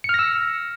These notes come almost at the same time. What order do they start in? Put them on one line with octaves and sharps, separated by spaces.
C#7 F6 A#6 E6